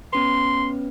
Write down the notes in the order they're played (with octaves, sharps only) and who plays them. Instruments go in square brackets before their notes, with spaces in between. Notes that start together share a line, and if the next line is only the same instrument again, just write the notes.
[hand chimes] B3 C#4 B4 [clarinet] C6